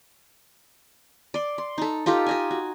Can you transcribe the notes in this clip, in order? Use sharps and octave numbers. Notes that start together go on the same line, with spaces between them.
D5 C6
C6
D#4 A4
D#4 F4 G4 A4
G4 D#5 G#5
F#4